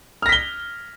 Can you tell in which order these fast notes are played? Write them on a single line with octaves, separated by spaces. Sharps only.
F6 A#6 B6 G7